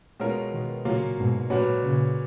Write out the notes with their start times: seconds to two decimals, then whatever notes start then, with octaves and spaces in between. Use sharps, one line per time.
0.20 B2 G#3 C#4 F4 A#4
0.52 B2 D#3
0.85 A#2 C#3 F#3 A#3 C#4 F4
1.18 G#2 B2
1.50 A#2 F#3 C#4 F#4 B4
1.83 A#2 C#3